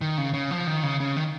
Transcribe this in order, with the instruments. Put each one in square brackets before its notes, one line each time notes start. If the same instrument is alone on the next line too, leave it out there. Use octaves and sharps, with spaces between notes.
[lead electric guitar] D#3
C#3
C#3
F3
D#3
C#3
C#3
D#3